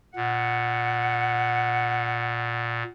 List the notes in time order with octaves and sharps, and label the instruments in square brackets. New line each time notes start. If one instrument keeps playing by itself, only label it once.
[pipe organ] A#2 [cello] F#5